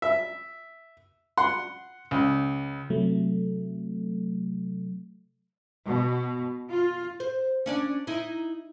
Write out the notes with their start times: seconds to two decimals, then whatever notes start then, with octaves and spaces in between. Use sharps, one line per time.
0.02 E5
1.37 F#5 C6
2.11 C#2
2.90 C3 F#3 A3
5.86 B2
6.70 F4
7.20 C5
7.66 C#4 D4 D5
8.07 D#4 E4